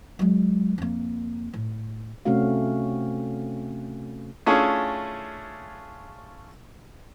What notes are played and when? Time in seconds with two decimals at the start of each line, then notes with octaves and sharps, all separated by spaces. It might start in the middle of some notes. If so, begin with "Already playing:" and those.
0.19 F#3 G#3
0.78 F2 A#3
1.54 A2
2.25 C3 A3 C4 C#4 F#4 F5
4.46 A3 C#4 D4 E4 F4 G#4